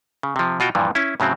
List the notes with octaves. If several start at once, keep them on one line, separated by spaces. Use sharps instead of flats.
C#3
C3 F3
B2 F4 F#4 G5
G2 A#2 E3 F3
C#4 E4
A2 C#3 F#3 C4